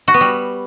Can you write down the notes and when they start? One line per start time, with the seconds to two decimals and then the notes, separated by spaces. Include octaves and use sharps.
0.08 F#4
0.14 B3
0.21 G3